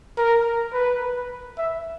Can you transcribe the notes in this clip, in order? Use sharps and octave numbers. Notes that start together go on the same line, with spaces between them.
A#4
B4
E5